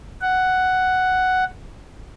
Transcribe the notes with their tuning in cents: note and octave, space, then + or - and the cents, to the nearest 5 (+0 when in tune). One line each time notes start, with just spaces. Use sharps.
F#5 +5